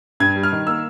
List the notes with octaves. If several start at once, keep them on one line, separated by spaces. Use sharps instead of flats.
G2 G#6
G3
F6
D#3
A#3 E6